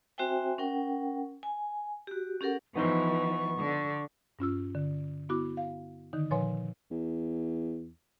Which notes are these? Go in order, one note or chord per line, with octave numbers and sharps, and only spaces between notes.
C4 F#4 C5 E5 G5 G#5
C#4 A#4 F#5 G5
G#5
F#4 G4
C#4 G4 A4 A#4 F#5
E3 F3 B3 D#4 C5 C#6
D3
G2 C#4 F4 E6
D3
B3 E4 F#4 D6
F5
D3 D#3 D#4
A#2 F3 B4 C#5 G#5 C6
E2